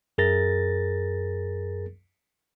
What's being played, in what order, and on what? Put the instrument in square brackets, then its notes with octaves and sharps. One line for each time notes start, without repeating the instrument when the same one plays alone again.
[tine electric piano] F#2 G#4 A#4 A6 A#6